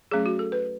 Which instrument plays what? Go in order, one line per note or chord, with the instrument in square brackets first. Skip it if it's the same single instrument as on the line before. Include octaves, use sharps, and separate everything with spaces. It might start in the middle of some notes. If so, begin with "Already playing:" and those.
[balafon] F#3 A3 C#4 G#4
F#4
A4
B4